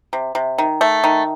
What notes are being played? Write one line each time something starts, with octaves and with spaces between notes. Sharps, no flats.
C3
C3
D#3
A3
D#3